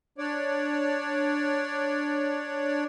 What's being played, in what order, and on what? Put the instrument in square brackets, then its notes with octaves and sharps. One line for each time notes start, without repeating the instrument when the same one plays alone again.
[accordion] D4 C#5 D5